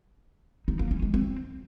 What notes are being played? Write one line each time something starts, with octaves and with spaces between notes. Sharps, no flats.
D#4
A#3
C#4
G#3
C4